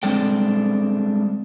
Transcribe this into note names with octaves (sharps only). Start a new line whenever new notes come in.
G3 G#3 C4 D4 A4 G5